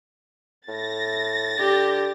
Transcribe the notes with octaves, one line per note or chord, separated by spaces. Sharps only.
A2 A6 A#6
D3 G4